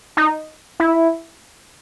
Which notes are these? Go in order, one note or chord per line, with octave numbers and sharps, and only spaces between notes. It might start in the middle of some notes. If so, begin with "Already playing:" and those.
D#4
E4